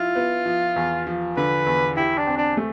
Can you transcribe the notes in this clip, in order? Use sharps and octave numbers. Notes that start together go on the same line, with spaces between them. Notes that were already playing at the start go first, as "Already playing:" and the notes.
Already playing: F3 E4 F4
B3
F3
E2
F3
D3 B4
E2
E4 G4
D4
C4
D4
A3